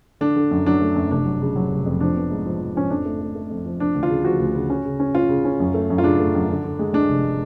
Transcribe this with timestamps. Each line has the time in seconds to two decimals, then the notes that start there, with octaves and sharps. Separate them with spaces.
0.21 D3 D4
0.36 D3
0.51 F#2
0.66 F#3 D4
0.81 A3
0.96 F#2
1.11 F1 D4
1.26 F#3
1.41 C#3
1.56 F#3
1.70 F1
1.86 F2
2.01 F3 D4
2.16 B3
2.30 G#2
2.46 F3
2.60 F3
2.75 F3 C#4
2.90 F2 D4
3.05 A3
3.21 A3
3.35 A3
3.50 F2
3.65 F3
3.80 F3 D4
3.95 D2
4.03 F4
4.09 C#3
4.25 F3 F#4
4.40 D2
4.55 C#3
4.70 C#4
4.85 C#3
5.00 C#4
5.15 C#4 F4
5.29 C#3
5.45 C#4
5.60 F#2
5.74 A3
5.90 F#2
5.98 F4
6.04 C#3 D4
6.19 A3
6.35 F#2
6.49 D3
6.64 D3
6.79 G#3
6.94 G#3 D4
7.09 F1